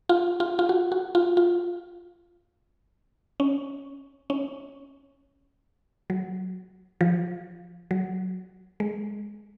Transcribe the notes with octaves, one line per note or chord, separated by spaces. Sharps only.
F4
F4
F4
F#4
F#4
F4
F4
C#4
C#4
F#3
F3
F#3
G#3